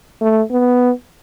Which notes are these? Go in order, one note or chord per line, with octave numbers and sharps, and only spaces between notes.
A3
B3